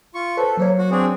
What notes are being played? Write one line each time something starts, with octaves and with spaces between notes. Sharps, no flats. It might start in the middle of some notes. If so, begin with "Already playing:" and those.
F4 C#6
A4 B4 C5
F#3 A#3 C5 C#5
F#4
C4 D4 G#4